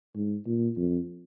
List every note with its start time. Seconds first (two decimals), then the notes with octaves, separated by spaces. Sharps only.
0.16 G#2
0.46 A#2
0.77 F2